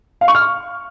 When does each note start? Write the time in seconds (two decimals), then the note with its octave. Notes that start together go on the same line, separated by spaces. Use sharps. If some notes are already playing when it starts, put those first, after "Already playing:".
0.21 F5
0.28 C#6
0.35 F6
0.41 C#6